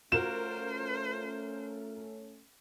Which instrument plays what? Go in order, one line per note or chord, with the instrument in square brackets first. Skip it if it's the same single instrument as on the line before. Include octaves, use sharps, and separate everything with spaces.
[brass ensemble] A3 C#4 [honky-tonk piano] F4 F#4 A#4 [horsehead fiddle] C5 [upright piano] E7